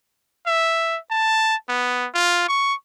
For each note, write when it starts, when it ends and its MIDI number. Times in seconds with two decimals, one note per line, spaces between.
0.47 0.98 76
1.11 1.55 81
1.69 2.08 59
2.14 2.48 65
2.49 2.74 85